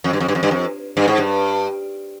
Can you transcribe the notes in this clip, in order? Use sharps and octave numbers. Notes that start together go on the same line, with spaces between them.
F2
G2
F2
G2
F2
G2
F2
G2
G#2
G2